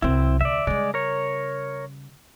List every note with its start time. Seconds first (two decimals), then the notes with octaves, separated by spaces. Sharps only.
0.02 C2 F#3 C4 E4
0.41 D2 D5 E5
0.67 C#3 G3 G#3 D5
0.94 A#4 C#5